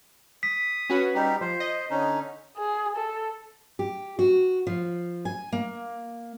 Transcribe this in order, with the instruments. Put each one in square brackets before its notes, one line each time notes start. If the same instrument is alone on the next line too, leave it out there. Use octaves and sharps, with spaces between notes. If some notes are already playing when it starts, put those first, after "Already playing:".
[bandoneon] D#6 [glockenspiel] B6
[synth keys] C#4 F#4 B4
[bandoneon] G3 D#4 G4
[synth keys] F3 [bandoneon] C5
[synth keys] D#5
[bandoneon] D3 C#4 D#4
[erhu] G#4
A4
[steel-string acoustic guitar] G4
F#4
F3
G#5
A#3